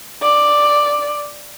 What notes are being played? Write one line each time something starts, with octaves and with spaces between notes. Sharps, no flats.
D5